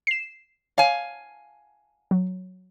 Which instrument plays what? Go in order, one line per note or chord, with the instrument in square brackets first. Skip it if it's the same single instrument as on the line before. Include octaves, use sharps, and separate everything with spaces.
[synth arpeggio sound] C7 E7
[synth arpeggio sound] C#5 [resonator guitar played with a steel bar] F5 G#5
[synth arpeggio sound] F#3